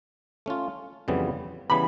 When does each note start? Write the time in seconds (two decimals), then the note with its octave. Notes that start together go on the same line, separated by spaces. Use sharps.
0.46 A3 C#4 F4
1.08 F2 C#3 E3 G3 B3
1.70 C#3 E3 G3 B3 B5